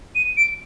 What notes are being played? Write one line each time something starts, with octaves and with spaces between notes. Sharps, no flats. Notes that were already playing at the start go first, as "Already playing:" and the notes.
D#7
D7